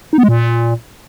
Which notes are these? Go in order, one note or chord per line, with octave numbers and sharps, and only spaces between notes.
D#4
B3
G#3
A#2